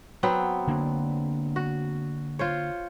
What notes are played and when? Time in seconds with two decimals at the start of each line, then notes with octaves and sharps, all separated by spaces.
0.23 F#3 B3 C4
0.67 D3 A#3 D4
1.56 F#4
2.39 F4 C5 C#5